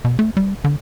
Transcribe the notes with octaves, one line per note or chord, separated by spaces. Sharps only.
B2
A3
G3
D3